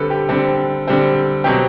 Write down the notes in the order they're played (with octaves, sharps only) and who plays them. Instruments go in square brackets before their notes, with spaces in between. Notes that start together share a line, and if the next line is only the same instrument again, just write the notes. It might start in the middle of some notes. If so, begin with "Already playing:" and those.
Already playing: [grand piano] D3 G3 C4 A4 B4
G4
D3 G3 C4
D3 G3 C4
B2 F#3 C4 G4